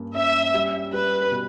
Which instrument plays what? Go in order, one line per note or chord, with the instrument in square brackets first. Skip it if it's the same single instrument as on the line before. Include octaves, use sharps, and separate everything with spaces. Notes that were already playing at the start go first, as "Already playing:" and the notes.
Already playing: [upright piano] G2 A#3 C#4
[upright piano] C#4 [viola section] E5
[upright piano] G3
[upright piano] G3 [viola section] B4
[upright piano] B2